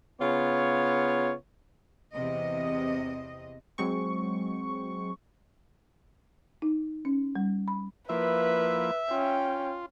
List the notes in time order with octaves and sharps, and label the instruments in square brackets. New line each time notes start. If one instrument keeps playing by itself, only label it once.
[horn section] C#3 B3 F4 C#5
[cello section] E2 C3 D#5
[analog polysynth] F#3 G#3 C4 C#6
[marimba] D#4
C#4
G3
B5
[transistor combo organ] F3 A#3 E4 [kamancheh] B4 [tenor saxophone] E5
[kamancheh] C#4 G5 [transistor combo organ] F4